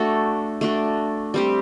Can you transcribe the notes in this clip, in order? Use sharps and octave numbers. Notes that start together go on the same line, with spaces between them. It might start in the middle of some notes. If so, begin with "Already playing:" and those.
Already playing: A3 D4 F#4 A4
A3 D4 F#4
G3 C4 G4